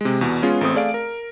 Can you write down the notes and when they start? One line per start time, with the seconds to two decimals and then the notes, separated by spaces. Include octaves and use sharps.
0.01 C3 G#3
0.21 E2 B2
0.42 G#3 B3 C#4 F4 G#4
0.61 A1 A3 C4 D#6
0.74 A3 G#4 D5 F5 D7
0.94 A#4